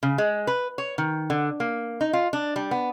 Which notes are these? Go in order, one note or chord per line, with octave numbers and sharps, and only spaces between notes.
C#3
G#3
B4
C#5
D#3
D3
A#3
D#4
F4
D4
G3
B3